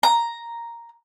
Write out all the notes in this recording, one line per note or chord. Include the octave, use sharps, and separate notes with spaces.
A#5